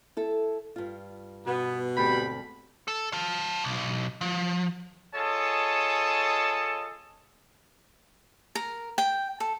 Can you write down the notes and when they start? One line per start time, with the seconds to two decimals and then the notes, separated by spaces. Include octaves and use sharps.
0.17 E4 A4
0.76 G2 F4
1.46 B2 B3
1.97 D2 G#2 G3 C4 B5
2.88 A4
3.13 F5 A5
3.64 B1
4.21 F3
5.15 F4 G#4 A4 C#5 D#5 A5
8.55 A#4
8.98 G5
9.40 A4